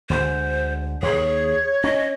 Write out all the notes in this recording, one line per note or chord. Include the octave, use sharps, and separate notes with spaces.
D2 D3 G#3 C5
D#2 G#4 C#5
C#4 D#5